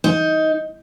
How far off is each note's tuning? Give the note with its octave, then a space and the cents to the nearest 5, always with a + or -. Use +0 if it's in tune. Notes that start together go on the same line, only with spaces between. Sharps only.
D#4 +15